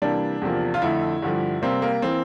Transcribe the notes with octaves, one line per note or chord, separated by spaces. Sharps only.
C3 E3 G3 A#3 D4
E2 C3 F3 A#3
F4
F2 D3 A3 E4
G2 D3 F3
C3 G3 A#3 C4
A#3
E3 A#3 C4